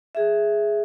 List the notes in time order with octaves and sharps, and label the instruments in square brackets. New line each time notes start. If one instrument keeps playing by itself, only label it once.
[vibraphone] G#4 E5